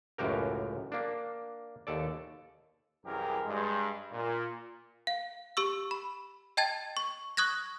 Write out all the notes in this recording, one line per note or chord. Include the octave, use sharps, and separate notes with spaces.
C#2 F#2 A2 F#4 G4 A#4
A#3 D4
D#2 A4 D5
C2 F#2 E3 G4 G#4 A#4
G2 G#3
A#2
F5
G4 C#6 E6
B5
D#5 G5 A5 G#6 A6
C#6
C#6 D#6 F#6 G#6 A#6